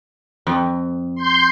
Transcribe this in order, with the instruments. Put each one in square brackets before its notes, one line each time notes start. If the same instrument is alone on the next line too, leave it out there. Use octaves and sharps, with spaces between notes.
[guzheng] F2
[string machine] C6 G6